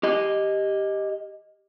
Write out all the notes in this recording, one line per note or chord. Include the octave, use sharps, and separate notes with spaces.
G4 D#5